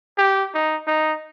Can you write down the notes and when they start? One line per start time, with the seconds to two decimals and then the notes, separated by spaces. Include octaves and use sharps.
0.18 G4
0.54 D#4
0.87 D#4